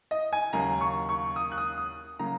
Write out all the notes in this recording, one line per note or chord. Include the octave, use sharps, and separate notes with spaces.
D#5
G#5
D#2 C#3 F#3 A#3 A#5
C#6
C#6
D#6
F#6
D#6
D#6
C#3 F#3 A#3 A#5